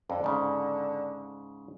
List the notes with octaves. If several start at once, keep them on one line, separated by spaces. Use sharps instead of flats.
F2 D3
G#2 C#3